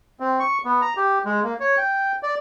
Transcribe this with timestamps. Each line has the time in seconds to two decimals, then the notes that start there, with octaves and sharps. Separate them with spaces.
0.20 C4
0.40 C#6
0.65 B3
0.82 A#5
0.97 G4
1.25 G#3
1.43 A#3
1.60 C#5
1.78 G5
2.23 D5